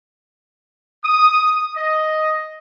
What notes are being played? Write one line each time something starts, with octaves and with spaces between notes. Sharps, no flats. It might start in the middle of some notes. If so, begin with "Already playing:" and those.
D#6
D#5